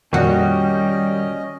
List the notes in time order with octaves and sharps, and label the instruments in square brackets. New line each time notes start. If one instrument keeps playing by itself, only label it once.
[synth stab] F2 A#2 F#4 [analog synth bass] D#3 [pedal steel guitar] G3 [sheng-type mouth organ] C#4 D#5